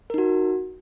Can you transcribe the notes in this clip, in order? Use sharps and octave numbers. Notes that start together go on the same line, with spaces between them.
D#4 F#4 A#4